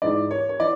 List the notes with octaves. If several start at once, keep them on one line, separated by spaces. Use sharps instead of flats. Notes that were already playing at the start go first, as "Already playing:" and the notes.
G#2 E3 D5
C#5
C#5
E3 D5